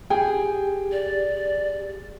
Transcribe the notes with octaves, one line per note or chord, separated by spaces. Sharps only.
G4 G#4 G5
D5